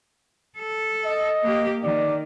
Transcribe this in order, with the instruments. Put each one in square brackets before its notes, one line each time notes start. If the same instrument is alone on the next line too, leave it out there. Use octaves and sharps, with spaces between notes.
[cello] A4
[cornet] D#5
[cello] A#3 G4
[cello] D#3 [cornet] D5